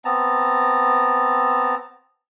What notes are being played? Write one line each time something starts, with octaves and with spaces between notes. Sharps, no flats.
B3 C4 A5 A#5